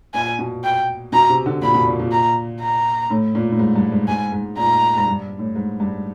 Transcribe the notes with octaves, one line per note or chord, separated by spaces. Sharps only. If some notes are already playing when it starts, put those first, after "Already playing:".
A#2 G#5
B2
G5
B2 A#5
C3
D3
A#2 B5
B2
A#2
A#2
A#5
A#5
A2
A#2
A2
G#2
G2
G#2
G#2 G#5
G#2
A#2 A#5
G#2
G2
A2
G#2
G2